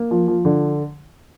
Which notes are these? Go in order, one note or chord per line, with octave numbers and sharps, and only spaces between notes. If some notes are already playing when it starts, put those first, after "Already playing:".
Already playing: A#3
F3
F3
D3